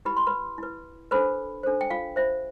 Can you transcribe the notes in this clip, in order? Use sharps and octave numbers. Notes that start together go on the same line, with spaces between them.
E4 G4 B4 B5
C6
B4 B5
E4 B4
D4 A4 B4 C5 B5
D4 A4 C5
G5
F4 F5
F4 C5 E5